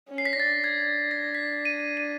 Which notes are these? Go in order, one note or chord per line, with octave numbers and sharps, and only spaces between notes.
C#4
C7
B6
A#6
D4 A6
G#6
A#6
B6
D#7
D#7